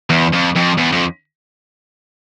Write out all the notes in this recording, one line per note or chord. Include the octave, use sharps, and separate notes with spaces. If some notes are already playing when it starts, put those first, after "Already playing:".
E2
F2
F2
E2
F2